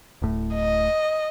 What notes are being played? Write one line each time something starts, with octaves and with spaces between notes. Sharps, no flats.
D1 A2
D#5